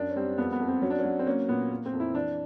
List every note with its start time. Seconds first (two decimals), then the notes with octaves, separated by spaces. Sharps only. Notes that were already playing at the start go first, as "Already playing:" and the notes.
Already playing: F#2 D4
0.10 C#4
0.16 G3 C4
0.38 F2 B3
0.52 B3
0.60 F2
0.68 C4
0.82 F#3 C#4
0.90 D4
0.99 C#4
1.05 F#3
1.19 C4
1.26 A#3 C#4
1.48 A#2 B3
1.70 A#3
1.86 C4
1.93 F2
2.00 E4
2.14 E3 D4